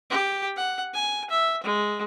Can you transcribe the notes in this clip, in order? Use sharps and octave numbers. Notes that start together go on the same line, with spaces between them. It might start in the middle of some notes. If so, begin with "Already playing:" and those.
G4
F#5
G#5
E5
G#3